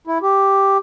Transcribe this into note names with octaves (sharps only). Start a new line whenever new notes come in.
E4
G4